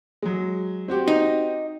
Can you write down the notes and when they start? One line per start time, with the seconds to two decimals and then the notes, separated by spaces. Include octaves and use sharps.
0.22 F#3 G#3
0.88 C4 F#4 G4
1.08 D#4